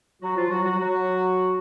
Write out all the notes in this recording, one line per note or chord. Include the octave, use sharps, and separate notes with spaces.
F#3 F#4
F3 F4
F#3 F#4
F#3 F#4
F#3 F#4